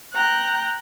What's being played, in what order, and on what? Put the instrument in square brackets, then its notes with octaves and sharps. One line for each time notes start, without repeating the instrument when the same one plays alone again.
[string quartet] G5 A#5 F#6